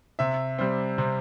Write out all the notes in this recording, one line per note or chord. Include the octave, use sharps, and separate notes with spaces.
C3 E5
G3 C4
C3